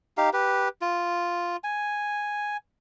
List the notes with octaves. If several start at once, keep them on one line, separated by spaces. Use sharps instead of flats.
D#4 G4 F5
G4 B4
F4
G#5